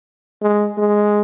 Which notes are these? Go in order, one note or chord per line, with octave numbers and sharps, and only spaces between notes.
G#3
G#3